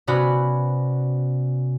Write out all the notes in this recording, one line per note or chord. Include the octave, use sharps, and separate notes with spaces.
C3 B3 C#4 F#4 D5 B5